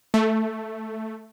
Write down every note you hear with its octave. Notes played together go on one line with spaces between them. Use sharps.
A3